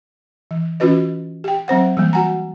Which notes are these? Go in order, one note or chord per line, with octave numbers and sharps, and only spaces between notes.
E3
E3 C#4 F4 F#4 B4 D#5
G4 G5
F#3 C4 C5 F#5
E3 G3 A#3
F#4 F#5 G#5 A#5